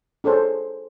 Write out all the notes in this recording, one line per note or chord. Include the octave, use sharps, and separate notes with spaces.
D4 G#4 A4 C5 C#5